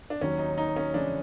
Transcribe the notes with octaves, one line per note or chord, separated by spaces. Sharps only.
D4
D#2 D#3 F#3 C#4
D#4
D#4
C#4
F2 C#3 E3 G#3 C#4 D4